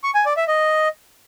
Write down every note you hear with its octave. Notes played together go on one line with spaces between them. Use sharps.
C#6
G#5
D5
E5
D#5